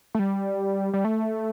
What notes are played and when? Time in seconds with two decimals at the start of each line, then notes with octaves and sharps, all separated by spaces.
0.15 A3
0.19 G3
0.94 G3
1.05 A3